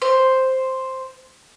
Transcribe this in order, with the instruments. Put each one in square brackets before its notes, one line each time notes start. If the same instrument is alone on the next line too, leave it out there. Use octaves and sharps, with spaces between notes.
[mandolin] C5